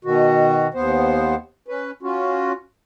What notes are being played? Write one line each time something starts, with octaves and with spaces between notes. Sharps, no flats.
B2 D#3 F#4
D#2 B3 C5
C#4 B4
C#4 F4 F#4